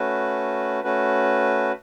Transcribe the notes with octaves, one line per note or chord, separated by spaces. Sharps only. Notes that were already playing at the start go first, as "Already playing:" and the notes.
Already playing: A3 C#4 F#4 B4
A3 C#4 F#4 B4